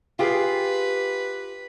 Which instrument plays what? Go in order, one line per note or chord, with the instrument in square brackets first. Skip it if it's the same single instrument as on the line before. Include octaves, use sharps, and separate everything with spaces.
[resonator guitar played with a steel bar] F4 G4 G#4 [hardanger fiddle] B4